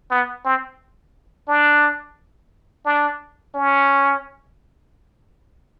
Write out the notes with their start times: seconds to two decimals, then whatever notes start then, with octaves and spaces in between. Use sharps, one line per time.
0.11 B3
0.45 C4
1.48 D4
2.86 D4
3.55 C#4